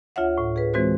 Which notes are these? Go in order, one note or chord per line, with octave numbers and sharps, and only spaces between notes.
D2 F4 C#5 E5 F#5
A2
G#4 B4
E3 G#3 C4 F#4 C5